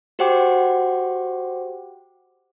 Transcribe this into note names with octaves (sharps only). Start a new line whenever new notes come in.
F#4 G4 C5 F#5 G5 D6